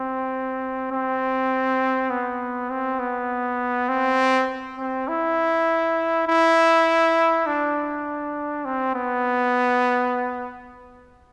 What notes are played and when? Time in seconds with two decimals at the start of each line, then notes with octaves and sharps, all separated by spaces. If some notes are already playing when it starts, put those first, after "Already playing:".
Already playing: C4
0.91 C4
2.10 B3
2.70 C4
2.99 B3
3.89 C4
4.78 C4
5.08 E4
6.28 E4
7.47 D4
8.65 C4
8.95 B3